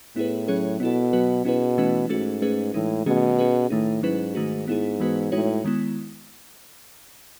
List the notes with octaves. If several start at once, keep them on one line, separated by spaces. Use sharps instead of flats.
A2 B3 E4 G#4 B4
F#3 C#4 G#4 C#5
B2 B3 E4 A4
F#3 B3 F#4 B4
B2 C#4 E4 G#4 B4
E3 A3 C#4 E4 B4
G#2 A3 C#4 F#4 A4
A3 C#4 G#4 B4
A2 E3 G#3 D#4
B2 D#3 A3 C#4 G#4
C#4 G#4 B4
A2 D#3 A3 D#4
G#2 F#3 C#4 E4 B4
D#3 A3 D#4 F#4
G#2 B3 E4 G#4
E3 G#3 B3 F#4 B4
A2 G#3 D#4 F#4 C#5
D#3 G#3 B3 E4